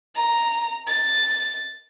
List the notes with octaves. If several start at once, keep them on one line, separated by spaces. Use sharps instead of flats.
A#5
A6